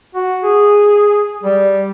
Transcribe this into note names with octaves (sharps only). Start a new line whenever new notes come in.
F#4
G#4
G3